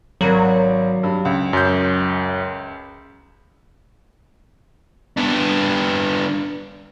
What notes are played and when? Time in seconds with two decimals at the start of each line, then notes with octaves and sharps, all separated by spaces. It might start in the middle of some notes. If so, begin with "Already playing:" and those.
0.21 G#1 F#3 A#4
1.03 G2
1.25 C#2
1.53 F#2 G6
5.17 B3 D4